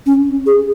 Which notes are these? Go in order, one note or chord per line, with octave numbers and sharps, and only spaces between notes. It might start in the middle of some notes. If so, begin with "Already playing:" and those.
C#4
G#4